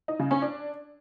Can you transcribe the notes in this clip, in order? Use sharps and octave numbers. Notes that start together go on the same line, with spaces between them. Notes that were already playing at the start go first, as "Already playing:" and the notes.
D#4
C#3
C#4
D4